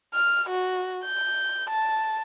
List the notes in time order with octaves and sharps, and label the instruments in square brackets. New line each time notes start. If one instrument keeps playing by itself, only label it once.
[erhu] F6
F#4
G6
A5